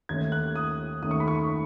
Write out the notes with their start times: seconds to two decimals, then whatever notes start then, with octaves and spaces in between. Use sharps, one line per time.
0.09 D#2 D#3 A3 C#4 G#6
0.32 F#6
0.56 D#6
1.02 D#2 D#3 A3 C#4 D#6
1.11 C#6
1.20 B5
1.28 C#6